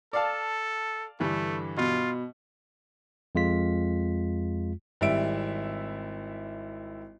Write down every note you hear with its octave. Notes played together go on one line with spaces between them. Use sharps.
A4 D5 F5 A5
G2 D3 E3 A3
B2 F4
F2 G#3 F4 B6
G#1 G3 E4 E5 D7